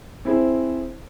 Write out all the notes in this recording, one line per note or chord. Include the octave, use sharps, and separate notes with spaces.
C4 E4 G#4 C5